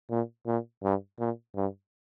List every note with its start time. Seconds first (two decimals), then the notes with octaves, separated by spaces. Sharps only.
0.10 A#2
0.47 A#2
0.83 G2
1.19 A#2
1.55 G2